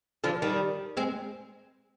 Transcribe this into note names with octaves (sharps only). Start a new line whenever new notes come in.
D3 F3
D#3 G3
G#3 C4